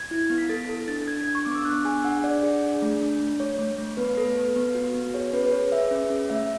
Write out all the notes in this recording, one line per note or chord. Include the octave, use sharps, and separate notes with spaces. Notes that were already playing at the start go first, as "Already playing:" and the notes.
Already playing: G#6
E4
B3
B6
A4 A6
A4
D4 A6
D4 G#6
D4
C#6
B3 D6
E6
D4 F#6
G#4 G#5
D4 F#5
D4 D5
G#4
D4
A3
D4
A3
A3 C#5
A3
A3
B3 B4
A4 B4
B3
B3
F#4
B3
G#4 C#5
C#4 B4
B4
G#4 C#5
G#4 E5
C#4
C#4
A3 E5